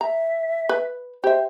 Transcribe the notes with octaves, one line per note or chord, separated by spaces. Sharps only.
E5 A#5
B4
G4 C5 E5